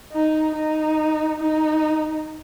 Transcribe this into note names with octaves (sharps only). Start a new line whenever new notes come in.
D#4
D#4
D#4